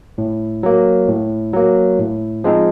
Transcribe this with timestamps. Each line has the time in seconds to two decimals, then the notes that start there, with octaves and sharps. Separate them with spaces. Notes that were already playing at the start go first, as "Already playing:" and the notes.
0.18 A2
0.63 F#3 A#3
1.08 A2
1.53 F#3 A#3
1.99 A2
2.44 F3 G#3 C4 D#4